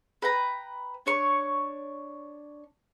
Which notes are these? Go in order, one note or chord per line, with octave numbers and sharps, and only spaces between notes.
B4 G5 A#5
D4 C#5 C#6